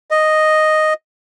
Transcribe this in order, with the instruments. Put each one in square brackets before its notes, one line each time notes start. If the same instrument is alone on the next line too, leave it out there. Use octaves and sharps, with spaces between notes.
[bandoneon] D#5